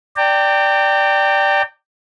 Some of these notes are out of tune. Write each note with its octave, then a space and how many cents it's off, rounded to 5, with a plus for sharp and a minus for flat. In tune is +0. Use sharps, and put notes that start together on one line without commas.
D5 +0 G5 +0 A#5 -45